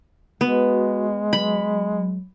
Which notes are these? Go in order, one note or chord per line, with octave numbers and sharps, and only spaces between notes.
G#3 B3 F#4
F#3 B5